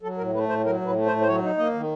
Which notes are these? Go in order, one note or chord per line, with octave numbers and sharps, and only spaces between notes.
F#3 A4
A2 A#4
A3 B4
A2 C5
F#3 A#4
A2 B4
A3
C5
A2
C5
F#3 C#5
D#4
A#3 D#5
D#3